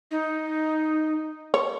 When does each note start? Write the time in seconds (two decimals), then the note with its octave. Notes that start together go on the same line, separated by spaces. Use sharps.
0.11 D#4
1.54 C#5